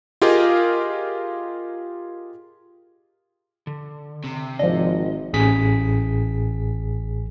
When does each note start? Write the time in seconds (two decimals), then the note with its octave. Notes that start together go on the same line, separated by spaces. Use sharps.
0.22 F4 G4 G#4 A#4 D#5 F5
3.67 D3
4.24 C3
4.59 G#1 F3 D4 D#5
5.33 A1 G#4 B6